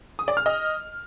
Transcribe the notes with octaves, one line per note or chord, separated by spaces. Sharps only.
D#6
D5
F6
D#5